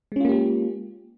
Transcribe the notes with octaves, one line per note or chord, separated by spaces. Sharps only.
G#3 A#3 C#4 F4 G4